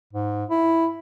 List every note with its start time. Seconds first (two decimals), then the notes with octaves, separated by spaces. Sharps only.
0.13 G#2
0.50 E4